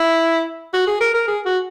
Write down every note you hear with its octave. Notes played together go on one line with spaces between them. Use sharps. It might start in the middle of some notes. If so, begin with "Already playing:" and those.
Already playing: E4
F#4
G#4
A#4
A#4
G#4
F#4